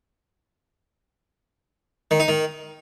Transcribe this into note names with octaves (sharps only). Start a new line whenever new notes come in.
D#3
D#4
D#3